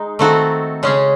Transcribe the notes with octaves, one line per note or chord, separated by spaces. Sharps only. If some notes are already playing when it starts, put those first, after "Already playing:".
Already playing: G#3 D#4
D#3 A3 C4 F#4 A4
C#3 G#3 C#4 G#4